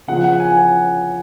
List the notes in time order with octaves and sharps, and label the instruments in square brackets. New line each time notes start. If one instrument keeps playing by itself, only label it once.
[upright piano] C#3 F3 B3 [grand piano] F#5
[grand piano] F#5
G#5
G#5
F#5